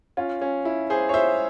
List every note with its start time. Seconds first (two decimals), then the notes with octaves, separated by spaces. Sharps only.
0.17 C#4 F4
0.41 C#4
0.65 E4
0.90 G#4 C5
1.09 C#5
1.14 C5 E5